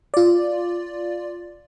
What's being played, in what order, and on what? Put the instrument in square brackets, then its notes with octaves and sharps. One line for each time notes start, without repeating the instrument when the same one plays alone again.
[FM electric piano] F4 D5